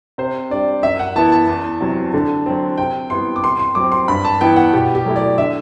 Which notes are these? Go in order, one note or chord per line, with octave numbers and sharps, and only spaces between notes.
C3 C5
G3 D4 D5
F#2 E5
F#5
E3 B3 E4 A5
A5
E2
C3 F#3
D3
F#3 C4
C3 G5
G3 B3 E4 C6
D6
C3 C6
C6
F#3 C4 D6
C6
G2 B5
A5
E3 B3 E4 G5
F#5
B2 G4
G4
F#3 A3 E4
D5
D3 E5